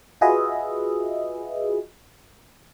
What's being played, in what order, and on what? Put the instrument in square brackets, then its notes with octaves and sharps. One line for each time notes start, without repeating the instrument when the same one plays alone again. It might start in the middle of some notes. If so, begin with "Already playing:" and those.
[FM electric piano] F4 F#4 G#4 B4 D#5 E5